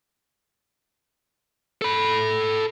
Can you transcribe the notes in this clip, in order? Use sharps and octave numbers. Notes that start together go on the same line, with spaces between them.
A4 B5